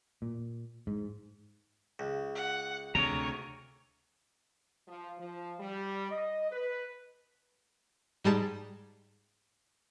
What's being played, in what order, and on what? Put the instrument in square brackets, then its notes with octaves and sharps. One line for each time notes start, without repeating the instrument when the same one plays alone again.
[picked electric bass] A#2
G#2
[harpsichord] C#2
[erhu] F#5
[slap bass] D2 C3 [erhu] C#5 [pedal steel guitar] A#5
[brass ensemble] F3
F3
G3
D#5
B4
[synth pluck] G#2 G3 G#3 A5